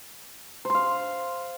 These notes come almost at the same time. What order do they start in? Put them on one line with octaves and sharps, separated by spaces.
C5 C6 F5